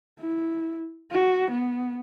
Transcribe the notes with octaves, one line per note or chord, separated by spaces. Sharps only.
E4
F#4
B3